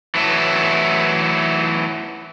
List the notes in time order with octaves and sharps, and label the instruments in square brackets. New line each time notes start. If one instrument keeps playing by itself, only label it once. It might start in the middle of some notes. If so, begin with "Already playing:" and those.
[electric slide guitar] E3 F#3 A3 E4